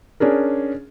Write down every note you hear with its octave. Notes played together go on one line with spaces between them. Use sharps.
C#4 D4 G#4 A#4